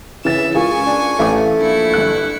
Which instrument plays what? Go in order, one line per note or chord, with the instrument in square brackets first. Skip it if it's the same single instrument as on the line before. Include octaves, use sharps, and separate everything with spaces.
[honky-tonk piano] C#3 A6 [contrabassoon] E3 [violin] E5 E7
[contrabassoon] C#2 [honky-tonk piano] F4 G#4 A#4 [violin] G#5 C#6
[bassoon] D4
[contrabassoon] A1 [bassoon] A3 [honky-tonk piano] F5 D6
[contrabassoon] A#1 [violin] E4 C#7
[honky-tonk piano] G1 F#6